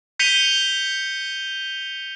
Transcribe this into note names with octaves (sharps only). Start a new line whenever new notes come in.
G6 B6 C#7 D#7 F7 G7